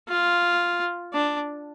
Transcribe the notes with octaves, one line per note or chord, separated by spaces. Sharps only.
F4
D4